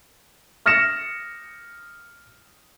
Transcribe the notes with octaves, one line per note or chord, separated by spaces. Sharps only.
D#6 F6 A#6 C#7 E7